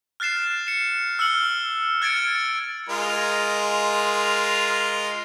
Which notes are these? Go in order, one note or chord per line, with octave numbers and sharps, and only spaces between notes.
F6 F#6 A6 C7 E7
C#7 E7
E6 F6 C#7 F#7
F6 G#6 A6 C#7 D7
G#3 F4 A#4